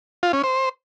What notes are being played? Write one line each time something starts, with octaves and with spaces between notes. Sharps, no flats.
F4
C#4
C5